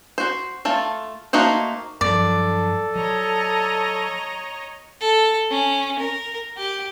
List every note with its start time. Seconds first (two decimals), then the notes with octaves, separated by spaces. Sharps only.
0.18 F#4 C5
0.65 A3 F4 A4
1.33 A3 A#3 D#4 F#4 C5
2.01 G2 F3 F#3 A4 D5
2.95 F#3 C#5 D#5 A#5
5.01 A4
5.50 C#4
5.99 A#4
6.57 G4